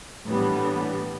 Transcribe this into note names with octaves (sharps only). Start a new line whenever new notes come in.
A2 E3 G3 B3 D4